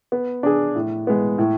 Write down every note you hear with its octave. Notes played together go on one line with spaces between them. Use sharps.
B3
D4 G#4
A2
G#3 B3
A2